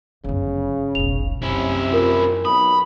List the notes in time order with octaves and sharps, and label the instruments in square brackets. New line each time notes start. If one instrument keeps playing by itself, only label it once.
[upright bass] G1 F#2 [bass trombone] C#3
[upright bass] F1 B1 [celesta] F7
[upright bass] F#2 [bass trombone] C3 [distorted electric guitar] C#4 E4
[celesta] F4 A#4
[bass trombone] B1 [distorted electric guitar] B5 [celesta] D#6